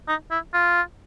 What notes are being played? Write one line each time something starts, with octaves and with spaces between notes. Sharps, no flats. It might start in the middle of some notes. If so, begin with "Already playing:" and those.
D#4
E4
F4